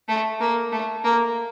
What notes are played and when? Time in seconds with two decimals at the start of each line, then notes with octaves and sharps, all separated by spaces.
0.08 A3
0.40 A#3
0.72 A3
1.04 A#3